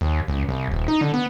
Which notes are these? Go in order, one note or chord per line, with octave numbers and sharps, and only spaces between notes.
D#2
C#2
C2
D#1
D#4
D3
B3